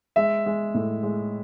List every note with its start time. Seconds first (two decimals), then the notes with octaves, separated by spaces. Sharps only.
0.16 G#3 E5
0.46 G#3
0.74 A2
1.03 G#3